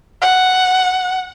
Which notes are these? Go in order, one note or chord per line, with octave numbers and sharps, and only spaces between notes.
F#5